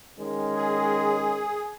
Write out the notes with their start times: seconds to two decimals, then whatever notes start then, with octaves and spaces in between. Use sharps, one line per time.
0.18 D#3 G#3 C#4
0.56 G#4